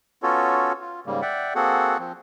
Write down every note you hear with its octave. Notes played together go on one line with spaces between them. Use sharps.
B3 C#4 F4 F#4 A4 C#5
F4
G#2 C#3 G3 A#3
D5 E5 F#5 G5
A#3 C4 F#4 G#4 A4 F#5
F3 C4